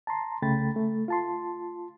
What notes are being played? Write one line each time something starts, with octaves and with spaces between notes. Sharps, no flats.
A5 A#5 C6
C2 C#3 A3 G5 B5 A6
A3
F4 A5 C6